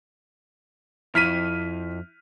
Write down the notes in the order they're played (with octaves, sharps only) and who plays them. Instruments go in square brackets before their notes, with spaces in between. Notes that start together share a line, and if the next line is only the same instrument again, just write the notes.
[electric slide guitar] F2 [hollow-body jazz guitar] E4 [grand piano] F6 B6 D#7